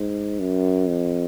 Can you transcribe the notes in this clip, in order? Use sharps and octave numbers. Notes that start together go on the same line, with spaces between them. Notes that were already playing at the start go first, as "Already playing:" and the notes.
Already playing: G#2
F#2
F2